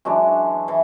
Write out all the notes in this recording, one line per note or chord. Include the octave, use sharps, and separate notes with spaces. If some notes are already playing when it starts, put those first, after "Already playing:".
F#2 E3 G#3 D4
E3